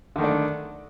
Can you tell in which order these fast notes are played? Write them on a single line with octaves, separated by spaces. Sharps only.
D3 D#3 A3 D4